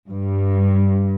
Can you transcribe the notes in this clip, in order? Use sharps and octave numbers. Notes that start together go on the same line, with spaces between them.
G2